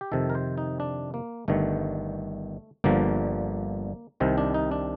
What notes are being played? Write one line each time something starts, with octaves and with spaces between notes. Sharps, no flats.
G4
F2 C3 D#3 A4
A#4
C5
D#4
D4
A#3
G1 G2 D#3 A3
G1 G2 D3 F3 A#3
C2 C3 D#3 C4
D4
D#4
D4